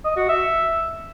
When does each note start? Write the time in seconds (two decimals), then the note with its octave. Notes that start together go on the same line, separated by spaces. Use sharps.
0.05 D#5
0.17 F#4
0.29 E5